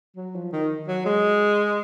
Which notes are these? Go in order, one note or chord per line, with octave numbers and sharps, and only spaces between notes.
F#3
F3
D#3
F#3
G#3